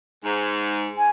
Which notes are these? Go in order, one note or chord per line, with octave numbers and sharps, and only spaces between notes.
G#2
G#5